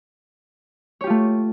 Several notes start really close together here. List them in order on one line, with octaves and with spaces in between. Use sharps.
C#5 G4 F4 A3